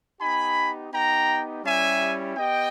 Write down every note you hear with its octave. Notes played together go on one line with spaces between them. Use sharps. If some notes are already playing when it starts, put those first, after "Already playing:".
B3 D#4 G4 G#5 B5
B3 D#4 G4 G5 A#5
G3 C#4 E4 G4 E5 G#5
B3 G4 D#5 G5